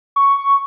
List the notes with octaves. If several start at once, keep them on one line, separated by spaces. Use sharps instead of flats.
C#6